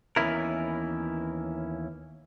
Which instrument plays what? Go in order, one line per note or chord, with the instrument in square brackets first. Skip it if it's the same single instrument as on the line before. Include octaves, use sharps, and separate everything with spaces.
[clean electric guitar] D#2 E3 B3 C#4 E4 A#4